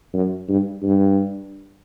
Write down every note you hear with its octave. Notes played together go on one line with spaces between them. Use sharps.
F#2
G2
G2